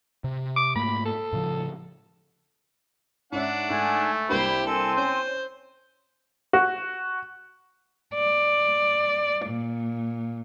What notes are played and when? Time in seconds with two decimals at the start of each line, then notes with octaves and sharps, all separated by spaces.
0.24 C3
0.56 D6
0.76 G#2 A3 A#3 B5
1.05 A4
1.33 A2 C#3 F3
3.32 G#2 C#4 D4 E5 F#5
3.70 G#2 A3 G#5
4.29 C2 A#3 D4 E4 G4 C5 B5
4.67 C4 A4 G#5 C6
4.96 C#4 C5 C#5
6.53 F#4
8.14 D5
9.46 A#2